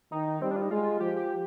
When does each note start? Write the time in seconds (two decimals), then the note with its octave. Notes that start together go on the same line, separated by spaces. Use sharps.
0.12 D#3 D#4
0.42 G3 C4
0.51 D4
0.56 F4
0.62 D#4
0.71 G#3 F4
1.00 F3 G4
1.16 G4